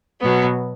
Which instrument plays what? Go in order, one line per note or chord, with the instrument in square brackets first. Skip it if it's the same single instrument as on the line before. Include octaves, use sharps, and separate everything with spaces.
[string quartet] B2 F#3 B3